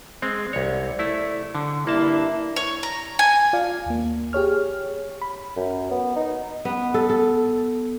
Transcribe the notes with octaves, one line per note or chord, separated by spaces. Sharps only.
G#3 C4
C2 C#5 D5
A3 E4
D3
G2 A#3 D4 E4 A5
C#5
A#5
G#5
F4 D5 F5
D#2 A#3
G4 G#4 C#5 F6
B5
F#2
B3
D#4
B3
A4
A4